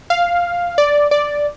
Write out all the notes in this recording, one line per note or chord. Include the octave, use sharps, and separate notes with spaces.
F5
D5
D5